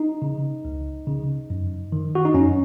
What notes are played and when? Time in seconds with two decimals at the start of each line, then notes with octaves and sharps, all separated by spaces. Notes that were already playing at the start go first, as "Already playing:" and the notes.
Already playing: D#4
0.22 C#3
0.65 C#2
1.07 C#3
1.50 F#2
1.92 D#3
2.15 F#4
2.25 D#4
2.34 F#2 C#4